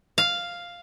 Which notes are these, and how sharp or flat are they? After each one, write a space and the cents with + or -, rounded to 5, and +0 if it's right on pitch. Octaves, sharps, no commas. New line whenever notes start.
F5 +0